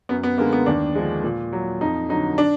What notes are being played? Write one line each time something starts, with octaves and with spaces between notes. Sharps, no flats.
F#2 B3
B3
D3 G#3 A#3
B3
D#2 D4
D3 F3 G#3
A#2
F#3
F2 D#4
D3 F#3 D#4
D4